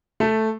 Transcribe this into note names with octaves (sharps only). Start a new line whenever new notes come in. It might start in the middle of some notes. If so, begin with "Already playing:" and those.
A3